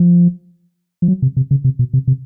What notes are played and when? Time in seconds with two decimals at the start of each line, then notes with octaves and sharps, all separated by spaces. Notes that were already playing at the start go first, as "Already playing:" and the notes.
Already playing: F3
1.02 F3
1.08 F#3
1.22 C3
1.37 C3
1.51 C#3
1.64 C3
1.79 B2
1.93 C3
2.07 C3